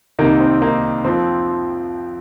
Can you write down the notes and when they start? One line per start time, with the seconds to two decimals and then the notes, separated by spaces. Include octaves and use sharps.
0.19 C2 C3 D#3 A#3 D#4
0.40 C4
0.62 A#3 D#4
1.04 F2 F3 C4